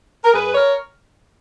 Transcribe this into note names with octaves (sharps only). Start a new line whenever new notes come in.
A#4
F#2 G#4 B4
A#4 C#5